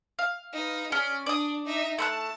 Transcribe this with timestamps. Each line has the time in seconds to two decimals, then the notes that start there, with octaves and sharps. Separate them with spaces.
0.19 F5
0.53 D#4 B4
0.92 C#4 G#4 D5
1.26 D4 D5 D#6
1.66 D#4 E5
1.98 A3 A5 B5 F#6